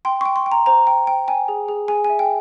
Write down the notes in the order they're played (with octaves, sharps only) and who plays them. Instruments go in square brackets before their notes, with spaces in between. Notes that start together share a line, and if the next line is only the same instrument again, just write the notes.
[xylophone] G5 C6
G5 C#6
C6
G5
A#5
C5 A#5
G5
G5
G5 G#5
G#4
G#4
G#4 G#5
G#5
E5
G5